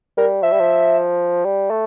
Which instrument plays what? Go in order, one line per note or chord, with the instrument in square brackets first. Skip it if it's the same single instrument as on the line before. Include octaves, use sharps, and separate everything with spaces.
[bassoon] G3 [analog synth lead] A#4
[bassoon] F3 [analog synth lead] E5
[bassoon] G3
F3
G3
A3